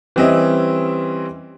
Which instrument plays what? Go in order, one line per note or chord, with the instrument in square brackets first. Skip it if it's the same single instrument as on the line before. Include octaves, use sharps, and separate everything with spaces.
[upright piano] E3 G3 C4 C#4 D#5 E5